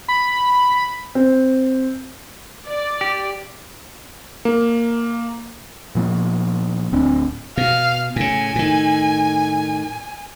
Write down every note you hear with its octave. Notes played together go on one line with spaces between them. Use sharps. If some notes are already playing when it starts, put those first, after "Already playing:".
B5
C4
D5
G4
A#3
A#2 F3 A#3 B3
D1 C4 D4
B2 F5
A2 C#3 G#5
A2 D#3